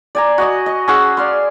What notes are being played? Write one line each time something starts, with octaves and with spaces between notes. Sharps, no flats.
D5 G#5 A#5
F#4 D#5 D#6
D#5
C#4 G#4 F#5 E6
D5 F5 C6